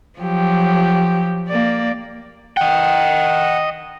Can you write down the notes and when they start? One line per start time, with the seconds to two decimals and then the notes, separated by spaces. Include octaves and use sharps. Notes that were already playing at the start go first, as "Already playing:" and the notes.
0.19 F3 F#3 G4
1.48 A#3 D5
2.57 D#5 F#5 G5